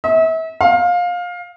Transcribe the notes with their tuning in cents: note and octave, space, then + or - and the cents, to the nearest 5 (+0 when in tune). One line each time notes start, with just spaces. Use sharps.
E5 -35
F5 +20